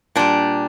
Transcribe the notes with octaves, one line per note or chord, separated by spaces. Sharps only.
A#2 G3 D4